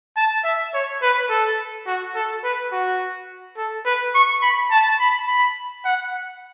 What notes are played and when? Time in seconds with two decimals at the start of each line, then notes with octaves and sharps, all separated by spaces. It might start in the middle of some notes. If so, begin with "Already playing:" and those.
0.17 A5
0.44 E5
0.74 C#5
1.02 B4
1.30 A4
1.87 F#4
2.15 A4
2.44 B4
2.72 F#4
3.57 A4
3.86 B4
4.15 C#6
4.42 B5
4.71 A5
5.00 B5
5.28 B5
5.85 F#5